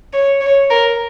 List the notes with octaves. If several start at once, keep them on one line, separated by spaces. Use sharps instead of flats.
C#5
C#5
A#4